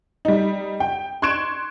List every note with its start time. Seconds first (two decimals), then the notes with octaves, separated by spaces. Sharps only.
0.25 G3 D#4
0.80 G5
1.22 C6 C#6 F#6 G#6 D7 E7